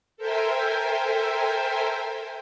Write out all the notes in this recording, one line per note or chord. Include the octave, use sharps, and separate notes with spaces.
A4 A#4 C5 E5 G5 G#5